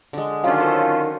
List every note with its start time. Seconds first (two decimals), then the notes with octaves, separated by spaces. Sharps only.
0.13 D3 G#3
0.44 D#3 F#3 C#4 D4 F4 F5
0.60 A4 C5